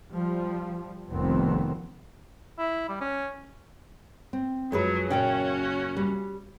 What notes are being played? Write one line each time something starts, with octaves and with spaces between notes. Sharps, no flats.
F3 G3
F1 C2 F2 D#3 B3 C4
E4
G3
C#4
C4
F#2 F3 F#3 G#3 G#4 B4
F#2 A#2 C#3 C#4 F#4 D5 G5
G3